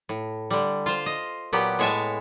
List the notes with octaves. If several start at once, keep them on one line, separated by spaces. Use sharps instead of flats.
A2
D3 G3
F4 C5
D#5
A#2 F#3 B3 G4
A2 G#3 C#5 E5 G#5 A5